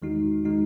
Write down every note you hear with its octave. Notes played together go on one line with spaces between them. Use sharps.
E2 D#3 G#3 D#4 F#4
D#3 G#3 D#4 F#4